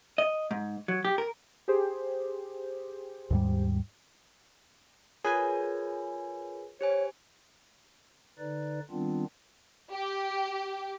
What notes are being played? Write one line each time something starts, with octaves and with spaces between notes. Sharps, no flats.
D#5
G#2
F#3
G4
A#4
G4 G#4 C5
D#2 G#2 G3
F4 G#4 A#4 B4 C#5 G#5
G4 C5 C#5 G#5
D3 D#4 B4 D5
D#3 G3 B3 C4 D4 F4
G4